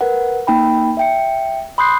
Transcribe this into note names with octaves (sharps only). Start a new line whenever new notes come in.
A#4 B4 F#5
A#3 D#4 G5 B5
E5 G5 C#7
B5 C6 D#6 F#6 G6 C7